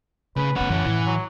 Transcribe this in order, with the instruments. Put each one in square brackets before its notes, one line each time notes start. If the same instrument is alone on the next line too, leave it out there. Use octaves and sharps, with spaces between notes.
[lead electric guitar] C#3 [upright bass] A3 D#4 [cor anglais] B4
[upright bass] F1 B3 [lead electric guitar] C#4 B4 [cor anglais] F#5
[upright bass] F#2 [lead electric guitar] E3 C#4
[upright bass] A2 [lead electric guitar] E3
[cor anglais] F#3